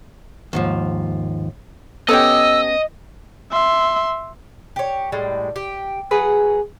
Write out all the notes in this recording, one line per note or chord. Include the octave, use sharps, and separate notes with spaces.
D#2 G#2 F3
B3 C#4 G4 A4 D#5 E6
E5 C6
G4 C#5
A2 G3 G#3
G4
F#3 F#4 G#4 B4